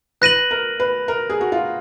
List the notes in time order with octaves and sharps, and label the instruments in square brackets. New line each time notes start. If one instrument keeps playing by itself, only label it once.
[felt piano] B4 [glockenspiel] F#6 A#6 D#7 F#7
[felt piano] A#4
B4
A#4
G#4
F#4
F4